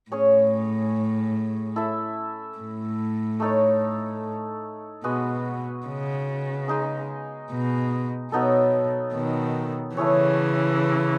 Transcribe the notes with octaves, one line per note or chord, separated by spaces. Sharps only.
A2 C#4 G#4 C#5
E4 A4 E5
A2
A3 D#4 A4 C#5
B2 G#3 B3 F#4
C#3
G#3 D#4 G#4
B2
B2 F#3 B3 D#4 A4
B2 D#3
C#3 E3 A3 E4 G#4 C#5